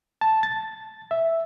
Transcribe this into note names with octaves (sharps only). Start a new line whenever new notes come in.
A5
A6
E5